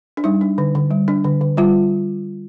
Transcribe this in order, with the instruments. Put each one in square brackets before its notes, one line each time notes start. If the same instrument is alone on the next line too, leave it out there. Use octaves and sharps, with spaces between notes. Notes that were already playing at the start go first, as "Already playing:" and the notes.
[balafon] D4
G3 D#4
D4
D3
D3
G3
D4
D3
D3
G3 F4